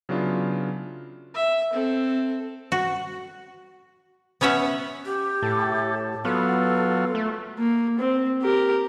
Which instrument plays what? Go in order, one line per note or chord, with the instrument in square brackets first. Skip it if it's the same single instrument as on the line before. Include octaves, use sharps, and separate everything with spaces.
[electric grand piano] C#3 F#3 B3 D4 E4 F4
[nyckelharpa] E5
C4 A4
[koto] F#4
B3 C#4 C#5 E5 F#5
[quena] G4
[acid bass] A2 [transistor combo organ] A4
[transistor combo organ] F#3 F4 [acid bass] B3 [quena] A4
[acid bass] A3
[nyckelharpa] A#3
C4
G4 A#4